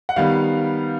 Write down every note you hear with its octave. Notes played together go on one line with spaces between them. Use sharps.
F#5
D#3 G3 B3 F5